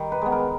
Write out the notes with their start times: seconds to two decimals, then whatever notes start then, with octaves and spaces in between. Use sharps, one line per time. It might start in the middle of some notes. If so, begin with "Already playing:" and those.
Already playing: D#3 G3
0.12 B4
0.21 G#3 B3
0.32 A#4